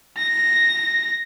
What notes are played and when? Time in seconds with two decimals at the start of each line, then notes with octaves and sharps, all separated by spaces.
0.18 A#6